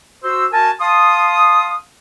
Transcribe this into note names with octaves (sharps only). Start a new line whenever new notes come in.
F#4 C5 E6
F#4 A#4 G#5 A5
F5 A5 C6 D#6